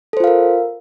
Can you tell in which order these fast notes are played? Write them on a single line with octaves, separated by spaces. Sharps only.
A4 C5 F4 F5 A#4